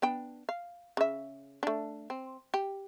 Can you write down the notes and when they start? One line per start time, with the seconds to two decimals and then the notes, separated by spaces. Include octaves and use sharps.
0.02 B3 D4 G5
0.49 F5
0.97 C#3 E5
1.63 A3 D4
2.10 C4
2.54 G4